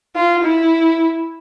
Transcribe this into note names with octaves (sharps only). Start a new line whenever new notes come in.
F4
E4